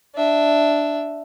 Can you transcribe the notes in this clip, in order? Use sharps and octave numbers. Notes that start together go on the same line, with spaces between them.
D4 E5